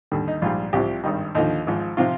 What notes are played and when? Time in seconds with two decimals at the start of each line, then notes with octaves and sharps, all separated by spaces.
0.12 D#2 D3 G3
0.28 D#4
0.42 A#1 G#2 G3 F4
0.73 C2 C3 F3 G4
1.04 G#1 G2 D#3 G3 D#4
1.35 D#2 D3 F3 D#4
1.66 G#1 G#2 F3
1.97 C3 F3 F4